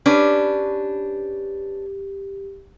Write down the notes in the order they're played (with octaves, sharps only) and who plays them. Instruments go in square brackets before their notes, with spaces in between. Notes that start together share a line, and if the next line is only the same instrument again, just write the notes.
[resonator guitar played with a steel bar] C#4 D4 B4 [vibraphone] G4